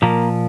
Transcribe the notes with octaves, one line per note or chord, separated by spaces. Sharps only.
A#2 F3 A#3